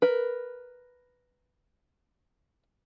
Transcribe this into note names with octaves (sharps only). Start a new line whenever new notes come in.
A#4 B4